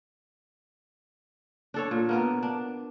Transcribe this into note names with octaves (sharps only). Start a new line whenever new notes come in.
D4 A4 C#5
A#2
A#3 B3 A#4
D4